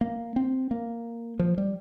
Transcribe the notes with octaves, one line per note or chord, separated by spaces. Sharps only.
A#3
C4
A#3
F3
G3